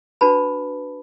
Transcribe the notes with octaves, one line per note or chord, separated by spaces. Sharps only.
D4 F#4 B4 A5 B5